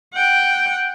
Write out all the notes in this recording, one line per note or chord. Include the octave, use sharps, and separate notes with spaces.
F#5 G5